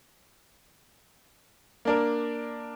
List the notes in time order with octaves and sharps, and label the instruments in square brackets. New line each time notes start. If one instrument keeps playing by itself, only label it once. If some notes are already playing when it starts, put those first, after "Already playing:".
[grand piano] A#3 D4 A#4